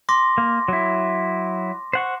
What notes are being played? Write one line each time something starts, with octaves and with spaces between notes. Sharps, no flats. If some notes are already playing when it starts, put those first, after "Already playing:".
C6 D6 A#6
A#3
F#3 E4
C5 F#5 C#6